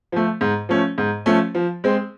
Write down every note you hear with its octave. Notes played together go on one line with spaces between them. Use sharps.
F3 A3
G#2
F3 A3 C#4
G#2
F3 A3 C#4
F3
G#3 C4